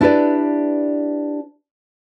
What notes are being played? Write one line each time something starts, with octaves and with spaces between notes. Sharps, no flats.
D4 E4 G4 A#4 B4 D5